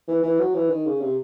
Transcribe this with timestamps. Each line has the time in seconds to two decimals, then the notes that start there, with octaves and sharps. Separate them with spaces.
0.08 E3
0.23 E3
0.39 F#3
0.54 E3
0.70 D#3
0.86 C#3
1.01 C3